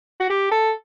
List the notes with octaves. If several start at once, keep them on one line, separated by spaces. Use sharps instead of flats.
F#4
G4
A4